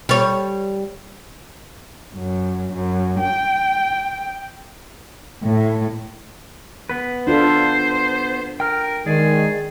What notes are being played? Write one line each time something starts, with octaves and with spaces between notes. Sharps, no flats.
G3 C#5
F#2
F#2
G5
A2
B3 B4
D4 F4 A4 C5
A#4 G5 F6
D#3 G#3 G#4 D5